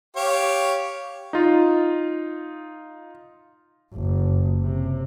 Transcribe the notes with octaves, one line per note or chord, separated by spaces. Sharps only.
G4 C#5 F5
D#4 F4
F#1
C3